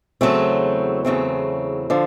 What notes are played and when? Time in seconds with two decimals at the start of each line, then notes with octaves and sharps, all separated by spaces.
0.21 E2 C#3 F#3 A3 C4
1.05 E2 C#3 F#3 A3 C4
1.90 D3 F3